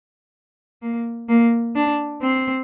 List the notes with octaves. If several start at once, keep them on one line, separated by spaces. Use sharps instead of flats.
A#3
A#3
D4
C4